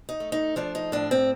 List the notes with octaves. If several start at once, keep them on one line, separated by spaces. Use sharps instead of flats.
D#4
A3
D#4
F3 D4
D#4
A2 D4
C4